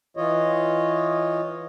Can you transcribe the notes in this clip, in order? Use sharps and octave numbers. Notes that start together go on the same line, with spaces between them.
E3 F4 C#5 D#5